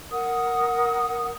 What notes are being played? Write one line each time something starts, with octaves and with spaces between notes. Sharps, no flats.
A#4 F#5 D#6